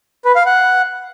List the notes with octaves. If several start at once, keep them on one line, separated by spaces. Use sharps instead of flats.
B4
F5
F#5